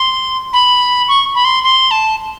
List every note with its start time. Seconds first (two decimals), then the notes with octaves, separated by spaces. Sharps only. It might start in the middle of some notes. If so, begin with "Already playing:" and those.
Already playing: C6
0.53 B5
1.08 C#6
1.35 B5
1.45 C6
1.64 C6
1.91 A5